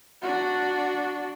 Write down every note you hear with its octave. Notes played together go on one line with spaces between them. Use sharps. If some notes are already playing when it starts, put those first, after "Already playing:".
D4 F#4